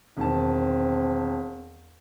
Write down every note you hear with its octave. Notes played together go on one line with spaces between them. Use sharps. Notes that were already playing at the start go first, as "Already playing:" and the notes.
E1 D#3 C4 A5